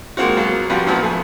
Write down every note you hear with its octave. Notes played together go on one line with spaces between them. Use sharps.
G#3 A#3 C4 F4 F#4
B2 F#3 A#3
F3 G3 C4 F4 F#4 B4
F#2 A#2 F3 B3
F2 A3 G#5